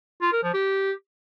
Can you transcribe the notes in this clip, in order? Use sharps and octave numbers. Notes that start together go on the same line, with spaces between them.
F4
A#4
F3
G4